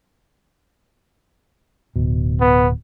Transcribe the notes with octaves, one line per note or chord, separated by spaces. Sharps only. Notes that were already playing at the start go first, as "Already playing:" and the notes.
D1 B2
B3